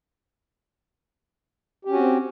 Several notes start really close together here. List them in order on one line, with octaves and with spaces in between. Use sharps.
G4 C#4 F#4 C4